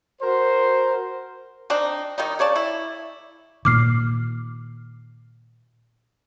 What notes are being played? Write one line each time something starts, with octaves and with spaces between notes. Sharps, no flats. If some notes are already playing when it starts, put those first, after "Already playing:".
F#4 A#4 C5
C4 D4 D#4
D#3 G3 D#4
C#3 C#5 D5 A5
E4
A#2 D#3 D6 F6 C7